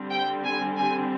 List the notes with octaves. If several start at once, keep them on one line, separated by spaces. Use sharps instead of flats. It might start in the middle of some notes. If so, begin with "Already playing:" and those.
Already playing: D3 G3 C4
G5
G#5
G#5